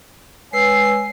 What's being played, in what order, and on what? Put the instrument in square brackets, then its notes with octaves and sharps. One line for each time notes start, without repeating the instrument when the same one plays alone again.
[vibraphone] G#3 B4 E6 [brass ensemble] C#5 G#5 [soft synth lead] C7